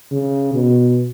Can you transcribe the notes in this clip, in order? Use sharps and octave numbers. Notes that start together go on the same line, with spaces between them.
C#3
B2